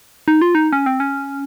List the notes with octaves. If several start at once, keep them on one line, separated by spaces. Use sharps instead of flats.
D#4
F4
D#4
C#4
C4
C#4